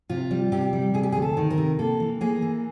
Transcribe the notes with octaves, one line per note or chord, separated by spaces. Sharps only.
C3 F4
G3
C3 G4
G3
C3 G#4
G4
G#4
D2
A4
D#3
A#4
C3
A#3 A4
E3
A#3 G#4
E3